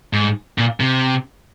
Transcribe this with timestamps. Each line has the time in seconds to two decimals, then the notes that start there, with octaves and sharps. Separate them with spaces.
0.13 G#2
0.58 A#2
0.80 C3